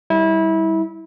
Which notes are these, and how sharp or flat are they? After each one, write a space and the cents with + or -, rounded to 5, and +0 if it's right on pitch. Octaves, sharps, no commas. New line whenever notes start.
G3 +0 E4 -25